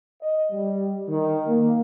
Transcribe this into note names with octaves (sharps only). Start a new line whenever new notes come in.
D#5
G3
D#3
A#3